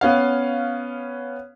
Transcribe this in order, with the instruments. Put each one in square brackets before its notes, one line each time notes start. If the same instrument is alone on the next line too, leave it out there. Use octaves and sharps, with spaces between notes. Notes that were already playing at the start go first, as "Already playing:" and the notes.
[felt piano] B3 C#4 F5